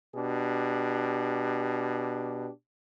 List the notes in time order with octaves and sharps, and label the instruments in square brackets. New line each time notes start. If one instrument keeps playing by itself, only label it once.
[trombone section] B2 D4 G4